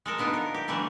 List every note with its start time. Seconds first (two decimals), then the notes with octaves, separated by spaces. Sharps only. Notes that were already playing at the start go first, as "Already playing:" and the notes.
0.06 G#3 A4 A#4
0.18 D3 B3 D#4 F4
0.34 A#4
0.54 G4
0.68 B2 D3 E3 G3 A3